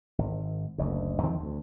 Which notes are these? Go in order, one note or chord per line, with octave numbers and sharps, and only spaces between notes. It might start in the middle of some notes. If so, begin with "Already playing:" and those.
G#1
F#1 D2
E2 D#3 F3 C4
D2